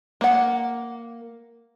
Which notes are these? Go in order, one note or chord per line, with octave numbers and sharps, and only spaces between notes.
A#3 F#5